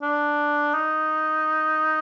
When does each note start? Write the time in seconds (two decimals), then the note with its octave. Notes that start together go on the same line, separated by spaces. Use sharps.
0.03 D4
0.74 D#4